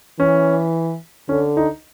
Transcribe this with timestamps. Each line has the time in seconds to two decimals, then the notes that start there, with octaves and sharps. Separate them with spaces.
0.19 E3 C#4
1.29 D3 C#4
1.57 D#4